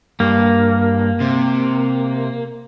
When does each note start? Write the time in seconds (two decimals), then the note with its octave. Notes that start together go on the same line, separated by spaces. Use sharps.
0.20 G2 A#3
1.21 C3